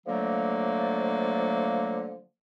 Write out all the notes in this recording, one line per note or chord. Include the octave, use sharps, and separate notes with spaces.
D3 F3 F#3 A3 A#3